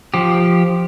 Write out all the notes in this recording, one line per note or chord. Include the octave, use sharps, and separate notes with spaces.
F3 G4